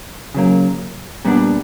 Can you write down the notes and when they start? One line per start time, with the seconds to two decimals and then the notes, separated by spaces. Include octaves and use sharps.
0.34 C#3 F#3 A#3
1.25 A#2 G3 B3 D4